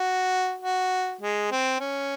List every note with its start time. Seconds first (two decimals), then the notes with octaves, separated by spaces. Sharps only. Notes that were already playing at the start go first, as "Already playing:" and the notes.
Already playing: F#4
0.62 F#4
1.21 G#3
1.51 C4
1.80 C#4